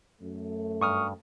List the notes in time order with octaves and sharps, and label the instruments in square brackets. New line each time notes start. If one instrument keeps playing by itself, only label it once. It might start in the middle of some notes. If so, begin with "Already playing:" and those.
[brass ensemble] F#2 A3
[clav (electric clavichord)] G2 [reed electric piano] C#6 D#6 F6